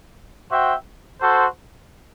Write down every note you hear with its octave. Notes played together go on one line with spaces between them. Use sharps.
F#4 C5 E5 G5
F#4 A4 C5